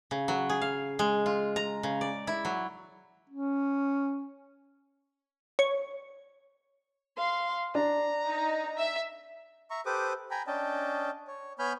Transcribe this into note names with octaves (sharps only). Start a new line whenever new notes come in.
C#3
F#3
G#4
F5
G#3
F4
A#5
C#3
D5
E4
F#3
C#4
C#5
F5 C6
D4 A#5
D#4
E5
E5 A#5 C#6
G4 A4 B4 C5 D6 D#6
G5 G#5 A#5 B5
C#4 D4 D#5 G5 A5
C#5
B3 C#5 G#5 B5 F6 G6